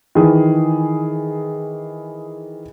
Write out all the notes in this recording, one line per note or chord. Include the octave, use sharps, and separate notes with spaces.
D#3 E3 G#4